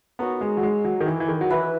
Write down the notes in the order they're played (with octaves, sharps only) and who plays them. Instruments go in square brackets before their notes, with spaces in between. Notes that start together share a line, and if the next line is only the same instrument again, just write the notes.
[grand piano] B3 [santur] D#4 F#4 A#4 C#5
[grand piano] G#3
F#3
G#3
F#3
D#3
E3
E3
D#3
F#3
[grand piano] E3 [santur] E4 B4 E5